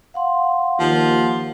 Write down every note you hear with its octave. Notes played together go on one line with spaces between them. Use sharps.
F5 F#5 C6
D#2 F3